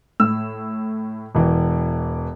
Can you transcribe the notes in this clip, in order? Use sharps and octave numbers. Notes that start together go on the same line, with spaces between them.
A2 E6
E1 E3